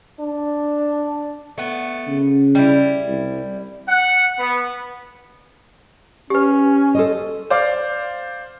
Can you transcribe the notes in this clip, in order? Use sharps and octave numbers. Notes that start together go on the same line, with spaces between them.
D4
A3 B3
C#3
G3 E4
C2
F#5
B3
C#4 G4 B4
A4 C5 D#5
C5 D5 F5 D6